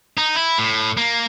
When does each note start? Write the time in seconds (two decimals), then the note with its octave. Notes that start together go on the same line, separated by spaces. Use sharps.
0.18 D#4
0.35 E4
0.58 A2
0.97 A#3